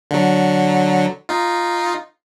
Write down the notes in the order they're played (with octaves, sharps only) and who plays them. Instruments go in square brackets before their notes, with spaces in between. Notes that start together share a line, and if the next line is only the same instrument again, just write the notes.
[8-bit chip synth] D3 F#3
D#4 F4